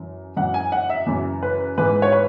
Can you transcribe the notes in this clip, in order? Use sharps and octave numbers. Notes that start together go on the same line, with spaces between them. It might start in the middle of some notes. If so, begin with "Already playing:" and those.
Already playing: F#2 E3
F#2 E3 F#5
G#5
F#5
E5
F#2 C#3 E3
B4
G#2 E3 B4
C#5
B4